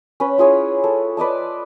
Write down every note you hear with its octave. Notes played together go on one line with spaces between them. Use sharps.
C#4 B4
E4 F4 G#4 C#5
A4
B4 D5 D#5 A5